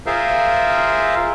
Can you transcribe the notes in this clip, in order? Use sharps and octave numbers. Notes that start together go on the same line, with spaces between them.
F4 G#4 A#4 C5 E5 F5